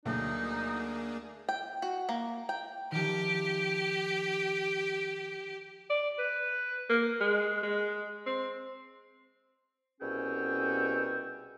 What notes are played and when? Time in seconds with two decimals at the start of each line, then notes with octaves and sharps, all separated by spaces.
0.05 D2 F#3 A#3 D4 D#4 G#4
1.49 G5
1.82 F#4
2.09 A#3
2.49 G5
2.92 D#3 F3 G4
5.90 D5
6.18 B4
6.89 A#3
7.21 G#3
7.63 G#3
8.26 C4
10.01 C2 B2 C#4 G#4 G5 E6